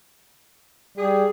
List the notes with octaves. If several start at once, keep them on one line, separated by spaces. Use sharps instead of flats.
G3 G#4